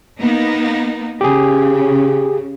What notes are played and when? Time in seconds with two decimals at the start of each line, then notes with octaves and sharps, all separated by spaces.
0.21 A#3 B3 D#4
1.21 C#3 G4 G#4